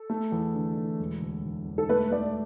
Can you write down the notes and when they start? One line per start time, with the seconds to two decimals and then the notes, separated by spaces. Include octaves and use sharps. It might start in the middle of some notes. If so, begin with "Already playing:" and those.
Already playing: A4
0.10 A3
0.32 E2
0.55 D3
0.77 E2
1.00 E1
1.21 D2
1.44 D2
1.67 E1
1.78 A4
1.89 A3 B4
2.11 A3 D5